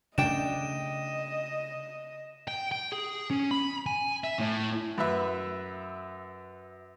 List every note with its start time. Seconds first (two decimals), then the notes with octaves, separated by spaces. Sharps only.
0.18 C#3 A3 D4 D#5 G5 E7
2.48 G5
2.72 G5
2.92 G#4
3.30 C#4
3.51 B5
3.86 G#5
4.24 E5
4.39 A2
4.98 F#2 B4 E5